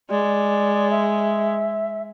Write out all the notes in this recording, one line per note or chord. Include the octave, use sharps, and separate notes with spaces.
G#3 D5
E5